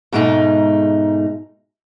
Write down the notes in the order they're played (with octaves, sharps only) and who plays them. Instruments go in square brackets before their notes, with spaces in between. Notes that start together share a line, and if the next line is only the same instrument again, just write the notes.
[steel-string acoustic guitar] G#2 B2 G#3 A3 D#4